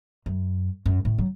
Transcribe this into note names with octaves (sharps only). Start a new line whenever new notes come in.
F#2
F#2
A2
F#3